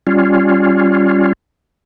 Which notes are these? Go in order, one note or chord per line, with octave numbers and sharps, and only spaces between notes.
G3 C#4 F4